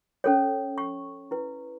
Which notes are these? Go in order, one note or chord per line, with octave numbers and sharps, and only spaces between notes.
C#4 A4 C#5
C#6
E4 B4